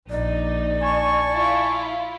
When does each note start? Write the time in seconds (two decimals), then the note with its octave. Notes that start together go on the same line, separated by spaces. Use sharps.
0.10 A#1 D#4 D5
0.82 G#5 A5 C#6
1.32 E4 F4